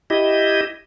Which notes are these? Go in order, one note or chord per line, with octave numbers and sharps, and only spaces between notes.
E4 G4 D#5